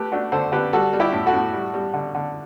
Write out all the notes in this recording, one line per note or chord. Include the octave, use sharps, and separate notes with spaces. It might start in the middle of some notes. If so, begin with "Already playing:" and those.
Already playing: A3 G4 B4
A3 D4 F#4
D3 A4 C5
D3 G4 B4
G3 F#4 A4
G3
E4 G4
A2
F#4 A4
A2
G3
G3
D3
D3